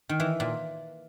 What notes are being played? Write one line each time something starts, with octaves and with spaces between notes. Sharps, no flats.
D#3
E3
A#2